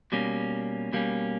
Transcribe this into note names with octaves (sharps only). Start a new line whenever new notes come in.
B2 G3 A#3 C#4
B2 G3 A#3 C#4